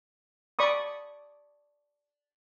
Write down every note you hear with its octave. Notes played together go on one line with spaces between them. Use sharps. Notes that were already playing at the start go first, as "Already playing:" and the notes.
D5 B5 C#6 D#6